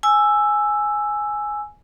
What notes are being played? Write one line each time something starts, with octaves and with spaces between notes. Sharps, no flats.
G#5 E6